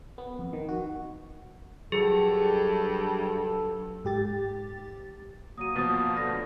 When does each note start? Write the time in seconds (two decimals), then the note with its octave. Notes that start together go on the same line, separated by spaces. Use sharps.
0.18 B3
0.39 F2
0.53 D#3
0.69 F#4
1.92 G2 F#3 G#4 A4
4.05 G#2 G4 A6
5.58 F#3 A#3 D#6 D#7
5.76 B2 F3 D#6 A6
6.17 D3 A3 A#6